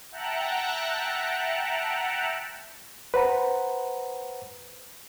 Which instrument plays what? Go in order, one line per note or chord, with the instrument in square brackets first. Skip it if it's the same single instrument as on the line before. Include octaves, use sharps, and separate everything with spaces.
[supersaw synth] E5 F#5 G5 A5 A#5 F#6
[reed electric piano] B4 C5 F#5 A#5 B5